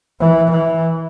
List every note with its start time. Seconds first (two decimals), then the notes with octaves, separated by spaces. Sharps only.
0.21 E3
0.51 E3